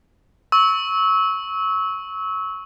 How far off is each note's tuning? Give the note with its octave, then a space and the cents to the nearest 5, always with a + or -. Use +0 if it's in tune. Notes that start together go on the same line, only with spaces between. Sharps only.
C#6 +0 E6 -25